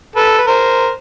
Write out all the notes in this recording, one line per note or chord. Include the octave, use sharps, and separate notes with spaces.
A4 B4
B4
A#4 C5